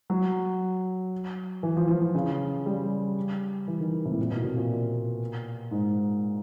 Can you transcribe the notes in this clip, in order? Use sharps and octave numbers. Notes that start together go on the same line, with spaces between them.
F#3
E3
F3
F3
F3
C#3
G3
E3
D#3
C3
A2
A#2
B2
C3
A#2
G#2